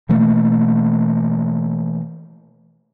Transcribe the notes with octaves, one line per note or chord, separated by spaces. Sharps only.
B2 E3 A3 A#3